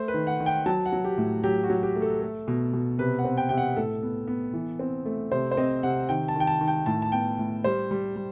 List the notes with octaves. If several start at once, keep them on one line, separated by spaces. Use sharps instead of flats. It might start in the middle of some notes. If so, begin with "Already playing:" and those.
Already playing: A3 C5
B4
D#3
F#5
D#3
G5
F#3 A5
F#5
F#3
G4
A2
F#3 G4
F#4
F#3
G4
A3
A4
A3
B2
B2
C3 B4
F#5
C4
G5
C3 G5
F#5
A2 A4
B3
B3
E3
C4
A3
C3 C5
C5
C4 D#5
C3 F#5
D#3 G5
A5
D#3 G5
A5
D#3
G5
A2 A5
A5
B3 G5
A2
G3 C5
G3
G3